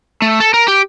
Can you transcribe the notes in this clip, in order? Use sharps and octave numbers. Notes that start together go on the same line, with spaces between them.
A3
A4
A#4
G4